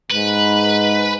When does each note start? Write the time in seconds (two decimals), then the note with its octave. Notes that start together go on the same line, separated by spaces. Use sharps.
0.11 G#2 B4